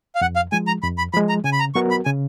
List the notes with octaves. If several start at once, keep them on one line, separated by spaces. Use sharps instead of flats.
F5
F2 F#5
F5
F3 G#3 G#5
A#5
F2 B5
B5
F3 G#3 B5
A#5
C#3 G#5
B5
A#5
F#3 B3 F#4 A#4 C#6
B5
C#3 G#5